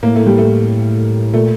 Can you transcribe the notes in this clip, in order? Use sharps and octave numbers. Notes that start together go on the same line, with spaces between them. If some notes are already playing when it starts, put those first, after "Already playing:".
A2 A#3
A3
G3
A3
A#2 A3